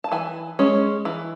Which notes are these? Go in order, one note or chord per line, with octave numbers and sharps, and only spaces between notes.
A5
E3 G#5
G#3 C#4
E3